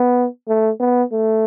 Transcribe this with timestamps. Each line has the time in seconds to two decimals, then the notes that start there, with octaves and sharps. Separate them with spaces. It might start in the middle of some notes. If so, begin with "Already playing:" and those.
Already playing: B3
0.48 A3
0.80 B3
1.13 A3